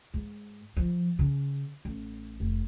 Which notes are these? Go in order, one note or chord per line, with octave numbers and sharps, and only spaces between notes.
G#2
F3
C#3
A1
F1